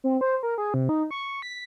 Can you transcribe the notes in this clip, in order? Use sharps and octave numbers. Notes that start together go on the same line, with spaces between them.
C4
C5
A#4
G#4
C3
D#4
C#6
B6